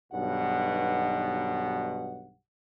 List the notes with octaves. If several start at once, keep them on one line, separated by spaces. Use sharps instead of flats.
B1 G2 B2 D#3 F#5